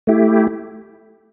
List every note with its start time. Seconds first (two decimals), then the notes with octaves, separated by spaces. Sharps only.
0.07 A3 E4 G4